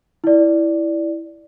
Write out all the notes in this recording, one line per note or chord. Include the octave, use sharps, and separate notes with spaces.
E4 D5